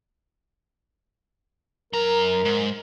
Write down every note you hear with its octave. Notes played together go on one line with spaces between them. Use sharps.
F#2 A#4 A#5
G#2